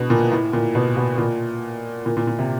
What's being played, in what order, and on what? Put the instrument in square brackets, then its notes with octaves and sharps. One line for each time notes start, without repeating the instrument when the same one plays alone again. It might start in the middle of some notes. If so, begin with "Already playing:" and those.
Already playing: [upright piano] B2 D3
A#2
A2
A#2
B2
B2
A#2
A#2
A#2
A#2
C3